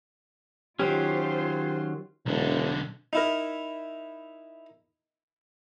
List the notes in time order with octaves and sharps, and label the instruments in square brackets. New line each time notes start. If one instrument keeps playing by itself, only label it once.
[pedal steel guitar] D#3 F#3 C#4 [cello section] F4 C5 [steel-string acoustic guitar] G4
[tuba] E1 [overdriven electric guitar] B1 D3
[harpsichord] D#4 E4 A#4